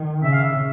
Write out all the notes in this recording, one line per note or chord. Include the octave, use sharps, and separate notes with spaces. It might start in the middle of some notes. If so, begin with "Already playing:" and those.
Already playing: D#3
C#3 E5
F5
E5